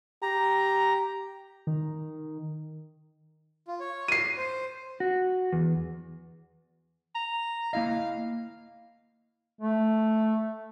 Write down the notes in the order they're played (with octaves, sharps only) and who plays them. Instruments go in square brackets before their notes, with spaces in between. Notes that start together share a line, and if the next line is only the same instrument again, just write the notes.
[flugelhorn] G4 [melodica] A#5
[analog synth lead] D#3
[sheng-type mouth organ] F4
C#5
[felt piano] C7 D#7
[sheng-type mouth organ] C5
[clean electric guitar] F#4
E2
[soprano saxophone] A#5
[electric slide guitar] A#3 E4 D#5 [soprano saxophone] F5
[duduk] A3